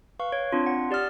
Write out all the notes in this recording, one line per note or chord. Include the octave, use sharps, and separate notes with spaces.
B4 F5 C#6
C#5
C4 D4 F4
F#5
G4 D5 D#6 F6 A6